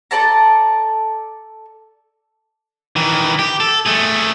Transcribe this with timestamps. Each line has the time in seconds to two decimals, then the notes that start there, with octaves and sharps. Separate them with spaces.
0.11 A4 D5 A5 A#5
2.96 D#3 E3
3.39 G4
3.60 A4
3.86 A3 G#4